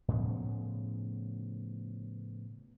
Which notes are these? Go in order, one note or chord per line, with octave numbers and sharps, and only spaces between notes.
A2 C#3 F3 B3